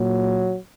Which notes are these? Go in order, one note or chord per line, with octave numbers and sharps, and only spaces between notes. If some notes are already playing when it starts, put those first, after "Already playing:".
Already playing: A#2 F#3